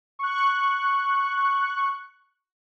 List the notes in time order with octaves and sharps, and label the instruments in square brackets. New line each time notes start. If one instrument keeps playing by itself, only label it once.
[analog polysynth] C#6 F#6